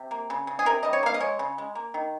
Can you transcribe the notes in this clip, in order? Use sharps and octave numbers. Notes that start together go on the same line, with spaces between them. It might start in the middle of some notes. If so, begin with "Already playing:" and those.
Already playing: C3
A#3
C#3
C#3
G#4
C3 A#4
G3 D#5
C#5
A#3 F5
D#5
G#3 C#5
C#3
G#3
A#3
D#3